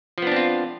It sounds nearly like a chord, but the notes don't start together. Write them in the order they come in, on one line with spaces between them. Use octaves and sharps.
F3 B3 D4 C4 F4